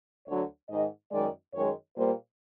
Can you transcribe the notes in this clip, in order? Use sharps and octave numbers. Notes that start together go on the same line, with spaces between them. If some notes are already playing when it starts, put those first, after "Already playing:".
D2 D3 F#3 C#5
G#2 D#3 G#3 D#5
F#2 D#3 G#3 D5
F#2 D#3 G#3 C#5
A#2 G3 A#3 C5